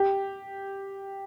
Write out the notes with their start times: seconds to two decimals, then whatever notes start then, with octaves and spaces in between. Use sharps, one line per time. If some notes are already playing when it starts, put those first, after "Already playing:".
Already playing: G4